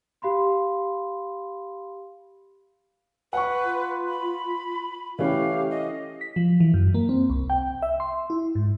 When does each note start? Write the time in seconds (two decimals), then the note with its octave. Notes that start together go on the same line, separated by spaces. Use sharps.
0.22 G4 F5 B5 C6
3.33 B4 F#5 C#6
3.64 F4
4.08 B5
5.19 E3 A3 C#4 G4 F5
5.71 D#5
6.21 B6
6.36 F3
6.60 E3
6.74 F#2
6.94 A#3
7.09 C4
7.30 C2
7.50 G5
7.82 E5
8.00 C6
8.30 E4
8.55 G#2